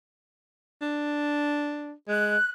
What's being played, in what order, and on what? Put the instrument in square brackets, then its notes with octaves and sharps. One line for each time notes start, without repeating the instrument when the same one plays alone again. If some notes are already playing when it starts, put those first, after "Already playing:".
[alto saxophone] D4
[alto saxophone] G#3 [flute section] F#6